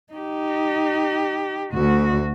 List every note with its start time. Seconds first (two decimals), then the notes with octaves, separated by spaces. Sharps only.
0.13 D#4 G4
1.72 D2 F#4